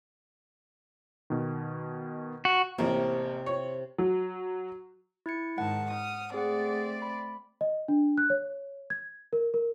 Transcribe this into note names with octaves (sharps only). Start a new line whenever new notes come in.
B2 D#3
F#4
A1 C3 A#3
C#5
F#3
E4 G#6 C#7
G#2 D#3 F#5 A5
D#6 F6
A3 C4 G#4 D5 F#5
B5
D#5
D4
F#6
C#5
G#6
A#4
A#4